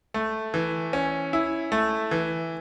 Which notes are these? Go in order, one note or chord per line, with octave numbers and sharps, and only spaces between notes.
A3
E3
C#4
E4
A3
E3